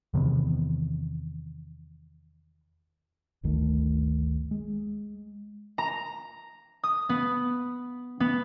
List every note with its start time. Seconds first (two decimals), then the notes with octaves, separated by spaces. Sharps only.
0.14 E2 C3 D#3 B3
3.43 G1 D2 D#3 A3
4.51 G#3
5.78 A#5
6.83 D#6
7.09 B3
8.20 B3